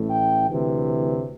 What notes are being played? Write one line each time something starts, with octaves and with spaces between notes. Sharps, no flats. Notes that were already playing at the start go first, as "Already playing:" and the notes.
Already playing: A1 A2 A3
G5
D2 C3 E3